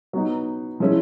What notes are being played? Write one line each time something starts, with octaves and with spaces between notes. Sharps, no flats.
F#3 B3 D#4
F3 G#3 C#4 E4